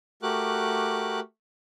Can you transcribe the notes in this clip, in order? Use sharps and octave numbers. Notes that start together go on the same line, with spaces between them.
A3 F#4 G4 A#4 D6 F#6